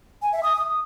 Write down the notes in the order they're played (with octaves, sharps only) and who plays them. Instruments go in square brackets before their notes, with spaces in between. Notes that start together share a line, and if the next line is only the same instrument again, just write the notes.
[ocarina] G#5
E5
D#6